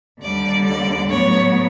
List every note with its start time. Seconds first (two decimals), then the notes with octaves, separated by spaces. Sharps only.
0.21 D#2 D3 G3 D5
0.65 D5
1.09 A2 F#3 B3 C#5